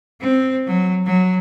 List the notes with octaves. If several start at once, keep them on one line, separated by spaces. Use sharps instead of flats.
C4
F#3
F#3